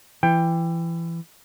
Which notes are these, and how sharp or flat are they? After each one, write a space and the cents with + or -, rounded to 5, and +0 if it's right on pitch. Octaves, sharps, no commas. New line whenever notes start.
E3 +25 G5 +15